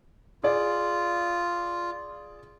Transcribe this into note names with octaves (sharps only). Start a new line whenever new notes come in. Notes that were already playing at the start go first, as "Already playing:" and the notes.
F4 G#4 D5